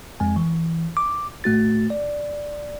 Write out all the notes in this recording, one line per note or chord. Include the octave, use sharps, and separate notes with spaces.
F2 G#3 G#5
E3
D6
A2 A3 F#4 A6
D5